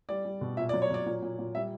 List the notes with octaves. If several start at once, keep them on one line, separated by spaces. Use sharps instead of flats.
G3 D5
G3
B2
A#2 E5
D5
F#3
C#5
F#3 D5
A#2
A#2
A#2
G3 E5